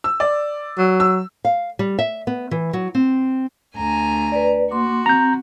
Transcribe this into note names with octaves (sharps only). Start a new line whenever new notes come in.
E6
D5
F#3
E6
F5
G3
E5
B3
E3
F#3
C4
D2 G#5 A#5
B4 D5
A#3 F#4 C6 D6
C4 A#5 G6